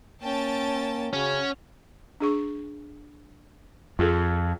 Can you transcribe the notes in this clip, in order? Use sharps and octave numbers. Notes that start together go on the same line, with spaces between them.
A#3 C#4 G5 A5 A6
C#3 C#4 F#4
D4 G#4 C#6
F2 F4 G#4 A4